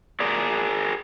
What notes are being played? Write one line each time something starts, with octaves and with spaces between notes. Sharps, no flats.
G#4 A#4 D5